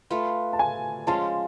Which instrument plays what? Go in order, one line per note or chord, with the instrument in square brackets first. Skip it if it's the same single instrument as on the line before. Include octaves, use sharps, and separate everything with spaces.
[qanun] A3 F4 B4
[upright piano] A5
G#5
[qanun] F3 G#3 C#4 F4 [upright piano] A5